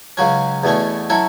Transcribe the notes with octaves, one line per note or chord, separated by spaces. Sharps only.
C#2 C#3 F#3 C#4
E2 B2 A3 C#4
F#3 C#4 E4 A4